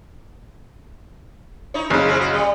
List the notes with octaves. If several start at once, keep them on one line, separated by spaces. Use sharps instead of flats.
D#4 E4 C#5
F#1 C#3
C4 E4 G#4
F#4
G3